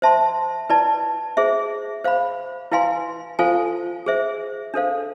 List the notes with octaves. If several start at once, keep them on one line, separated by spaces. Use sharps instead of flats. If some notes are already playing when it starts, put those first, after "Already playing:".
C5 E5 A5 C6
E4 B4 D5 A5
G#4 C5 E5
C5 F5 B5
E4 B4 F5 G#5 C6
F4 A4 C5 F5 G#5
G#4 C5 E5
D4 A4 C5 F5